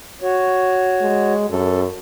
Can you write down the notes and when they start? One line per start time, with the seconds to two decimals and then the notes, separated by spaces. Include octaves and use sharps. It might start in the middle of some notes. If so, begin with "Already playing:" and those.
0.22 F#4 C#5
1.01 G#3
1.50 F#2 A4